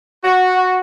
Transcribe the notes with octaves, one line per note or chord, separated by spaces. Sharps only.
F#4